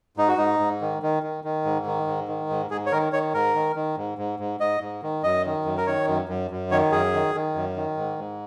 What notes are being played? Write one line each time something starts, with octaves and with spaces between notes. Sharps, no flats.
G#2 D#4
F#4
G#2 D#4
G#2
D#3
D#3
D#3
D#3
G#2
D#3
G#2
D#3
G#2
G#2 G#4
C#5
D#3 A#4
D#3 C#5
G#2 A#4
D#3
D#3
G#2
G#2
G#2
G#2 D#5
G#2
D#3
F#2 D#5
D#3
F#2
A#4
D#3 C#5
F#2
F#2
F#2
D#3 C#5
F#2 G#4
D#3
D#3
F#2
D#3
G#2
G#2